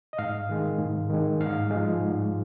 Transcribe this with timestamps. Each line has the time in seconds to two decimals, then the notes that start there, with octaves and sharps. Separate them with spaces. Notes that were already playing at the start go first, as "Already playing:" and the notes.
0.13 D#5
0.18 G#2 F5
0.49 D#3 G#3
0.79 G#2
1.10 D#3 G#3
1.41 G#2 F5
1.71 F3 G#3
2.01 G#2